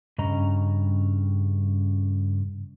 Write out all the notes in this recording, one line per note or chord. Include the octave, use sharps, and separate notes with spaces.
G2 C#3 C#4 D#5 A#5